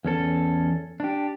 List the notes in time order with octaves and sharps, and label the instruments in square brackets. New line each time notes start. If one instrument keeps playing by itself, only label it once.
[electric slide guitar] E2 C#4 A4
D4 G4